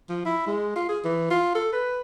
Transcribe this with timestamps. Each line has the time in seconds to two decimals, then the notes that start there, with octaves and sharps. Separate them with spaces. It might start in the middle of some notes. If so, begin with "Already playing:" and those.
0.09 F3
0.25 E4
0.47 G#3
0.76 F4
0.89 G#4
1.04 E3
1.30 F4
1.55 A4
1.73 B4